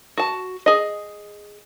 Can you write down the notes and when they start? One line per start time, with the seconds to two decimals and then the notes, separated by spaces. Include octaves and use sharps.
0.18 F#4 A5
0.66 G#4 D#5